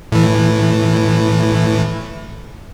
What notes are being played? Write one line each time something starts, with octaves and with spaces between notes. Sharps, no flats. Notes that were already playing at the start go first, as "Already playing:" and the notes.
A2 E3